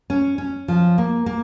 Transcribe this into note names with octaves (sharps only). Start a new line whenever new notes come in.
C#4
C#4
F3
A#3
A#3